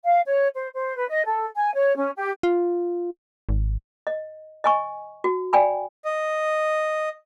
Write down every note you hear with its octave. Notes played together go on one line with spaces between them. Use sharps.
F5
C#5
C5
C5
B4
D#5
A4
G#5
C#5
C#4
G4
F4
G#1
D#5
D#5 G#5 C#6
F#4
D5 G5 G#5 B5
D#5